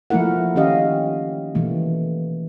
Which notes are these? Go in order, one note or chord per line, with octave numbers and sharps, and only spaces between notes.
F3 A3 A#3 E4 A#4 F#5
D#3 C#4 G4 D#5 F5
B2 E3 A3 A#3